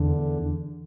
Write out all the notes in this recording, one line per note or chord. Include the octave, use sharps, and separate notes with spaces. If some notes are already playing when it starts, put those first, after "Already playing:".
Already playing: E2 D3